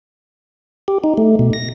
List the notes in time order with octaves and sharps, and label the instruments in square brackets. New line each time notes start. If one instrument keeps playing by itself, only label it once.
[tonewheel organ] G4
D#4
A3
B2
A#6